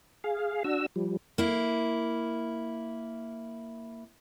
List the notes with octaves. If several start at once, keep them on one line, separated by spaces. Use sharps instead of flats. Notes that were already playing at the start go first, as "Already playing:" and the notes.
G#4 F5
D4 F#4 E6
F3 G3
A#3 E4